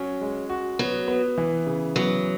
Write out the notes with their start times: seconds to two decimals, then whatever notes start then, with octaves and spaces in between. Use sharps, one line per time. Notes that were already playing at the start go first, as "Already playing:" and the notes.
Already playing: F#3 C#4
0.21 G#3
0.50 F#4
0.79 F#3 B3
1.08 B3
1.38 E3
1.67 C#3
1.96 F#3 B3